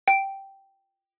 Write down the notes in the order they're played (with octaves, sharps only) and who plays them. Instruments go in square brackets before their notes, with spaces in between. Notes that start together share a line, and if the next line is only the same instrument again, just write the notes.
[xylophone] G5 D7